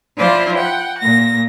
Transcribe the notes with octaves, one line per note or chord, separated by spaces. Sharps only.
F3 E4 F4 C5 D5
F#5 G5
A#2 A#6